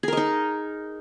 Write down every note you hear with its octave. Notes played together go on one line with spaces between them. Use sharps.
D#4 G#4 A#4 D#5